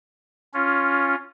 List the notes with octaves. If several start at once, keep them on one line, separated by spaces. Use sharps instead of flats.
C#4 F4